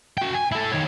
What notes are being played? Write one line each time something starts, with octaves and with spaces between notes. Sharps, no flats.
F#4 G5
G#5
E4 A4
D#3 C#5